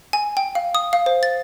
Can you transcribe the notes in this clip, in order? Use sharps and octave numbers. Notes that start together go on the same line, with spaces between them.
G#5
G5
F5
D#6
F5
C5
A6